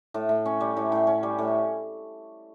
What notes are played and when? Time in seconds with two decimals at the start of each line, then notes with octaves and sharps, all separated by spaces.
0.14 A2
0.29 A2
0.46 C#4
0.61 G3
0.77 A2
0.92 A2
1.07 C#4
1.23 G3
1.39 A2